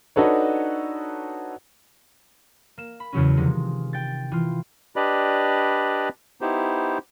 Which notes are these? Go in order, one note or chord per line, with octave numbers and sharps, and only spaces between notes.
D4 D#4 F#4 A4 B4 C#5
A#3 E7
B5
E2 C#3 F#3 C#4
C3 D#3 F3 G#3
G5 A6
E3 F4
D4 G4 B4 D5 D#5 B5
B3 D#4 E4 G4 C5